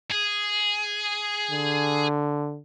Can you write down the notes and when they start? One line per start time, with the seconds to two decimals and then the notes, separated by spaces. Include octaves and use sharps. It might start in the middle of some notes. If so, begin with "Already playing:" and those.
0.12 G#4
1.51 D3